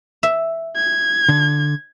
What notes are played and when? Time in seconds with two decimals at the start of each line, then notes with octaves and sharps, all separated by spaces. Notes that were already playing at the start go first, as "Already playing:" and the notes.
0.23 E5
0.76 G#6
1.29 D3